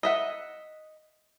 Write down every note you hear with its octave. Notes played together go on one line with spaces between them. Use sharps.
D#5 E5 F#5